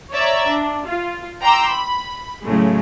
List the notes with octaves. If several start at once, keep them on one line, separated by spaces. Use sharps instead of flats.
C#5 D5 E5 A#5
D4
F4
G5 A#5 C6 D6 E6
B5
A2 C#3 F#3 G#3 A3